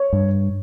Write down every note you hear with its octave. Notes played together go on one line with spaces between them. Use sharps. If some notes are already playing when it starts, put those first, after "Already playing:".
Already playing: C#5
G2